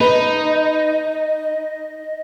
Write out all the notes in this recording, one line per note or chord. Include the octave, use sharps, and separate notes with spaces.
D#4 B4 D#5